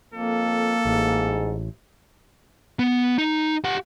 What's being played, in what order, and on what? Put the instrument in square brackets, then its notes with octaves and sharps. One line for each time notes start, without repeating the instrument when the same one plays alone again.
[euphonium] F2 [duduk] A#3 [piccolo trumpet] A4
[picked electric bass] A1 [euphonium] G#2
[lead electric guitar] B3
D#4
G4 F#5